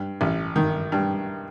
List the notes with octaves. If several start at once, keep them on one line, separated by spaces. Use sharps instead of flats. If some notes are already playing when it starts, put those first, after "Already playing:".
Already playing: G2
A1
D#3
G2